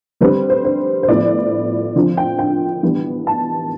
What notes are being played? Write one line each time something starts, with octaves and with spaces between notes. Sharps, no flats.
D3 G3 C4 B4
C5
C5
C5
A2 F3 B3 D5
D3 F3 C4
G5
G5
E3 G3 B3 D4
A5